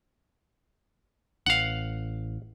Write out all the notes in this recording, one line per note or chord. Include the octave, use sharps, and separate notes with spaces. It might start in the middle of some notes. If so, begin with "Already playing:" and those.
A1 F5 F#5